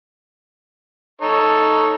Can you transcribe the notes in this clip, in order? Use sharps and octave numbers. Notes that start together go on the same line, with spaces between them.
D#4 A4 C#5